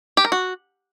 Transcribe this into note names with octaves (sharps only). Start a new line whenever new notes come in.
G4
A#4
F#4